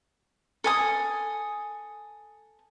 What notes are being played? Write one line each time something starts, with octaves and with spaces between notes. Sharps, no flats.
A4 G#5 D#6